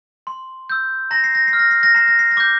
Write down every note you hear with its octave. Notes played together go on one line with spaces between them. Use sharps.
C6
E6 G6
A#5 A#6
C7
A#6
C7
F6
A#6
C7
A#6
A#5 C7
A#6
C7
A#6
D6 G6